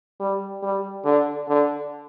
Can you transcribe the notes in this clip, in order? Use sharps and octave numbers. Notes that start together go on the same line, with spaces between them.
G3
G3
D3
D3